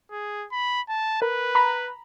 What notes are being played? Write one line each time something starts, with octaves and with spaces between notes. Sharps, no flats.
G#4
B5
A5
A#4 B4
A#5 B5